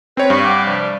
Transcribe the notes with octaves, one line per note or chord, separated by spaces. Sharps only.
C4 B4 C#5
G2 D5 F5 C#6
F#5 G5 D6
C3 F3 G3